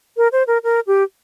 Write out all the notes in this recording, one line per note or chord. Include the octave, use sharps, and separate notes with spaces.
A#4
C5
A#4
A#4
G4